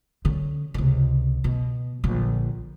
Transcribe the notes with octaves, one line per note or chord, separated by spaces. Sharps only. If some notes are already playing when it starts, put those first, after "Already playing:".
D3 C#4
C#2 C3
B2
A#1 D3